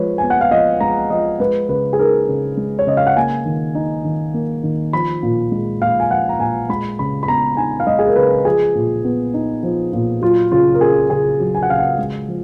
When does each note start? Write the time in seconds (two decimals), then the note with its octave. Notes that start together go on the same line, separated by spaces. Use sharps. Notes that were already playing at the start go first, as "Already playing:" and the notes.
Already playing: F3 G#3 B4 C#5
0.18 B3 G#5
0.30 F#5
0.41 F5
0.51 F3 D#5
0.81 G#3 A#5
1.10 F3 D#5
1.40 G#3 B4
1.69 C#3 B4
1.93 G#4
1.99 D#4 A#4
2.28 C#3
2.57 G#3
2.79 C#5
2.87 C#3 D#5
2.97 F5
3.07 F#5
3.16 A#3 G#5
3.45 D#3
3.75 D#4
4.05 D#3
4.34 A#3
4.63 D#3
4.93 F3 B5
5.23 A#2
5.52 G#3
5.81 A#2 F5
6.00 G#5
6.10 F3 F#5
6.29 A#5
6.39 A#2 G#5
6.69 G#3 B5
6.99 C#3 B5
7.23 B5
7.28 B3 A#5
7.57 D#4 G#5
7.80 F5
7.87 G#3 D#5
7.99 G#4
8.08 A#4
8.16 C#3 B4
8.45 F3 G#4
8.75 A#2
9.05 B3
9.34 D#4
9.63 F3
9.93 A#2
10.22 F#3 F4
10.52 C#3 F4
10.74 A#4
10.81 C#4 G#4
11.10 C#3 G#4
11.40 F#3
11.55 G#5
11.63 F#5
11.69 C#3 F5
11.79 F#5
11.98 G#3
12.28 F3